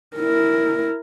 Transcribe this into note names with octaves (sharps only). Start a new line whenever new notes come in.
E4 A#4